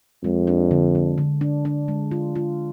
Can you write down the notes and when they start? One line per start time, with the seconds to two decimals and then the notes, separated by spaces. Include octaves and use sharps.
0.24 F2 G#3
0.47 D4
0.71 D3
0.95 D3
1.18 D3
1.41 D4
1.65 D4
1.88 G#3
2.11 F4
2.36 F4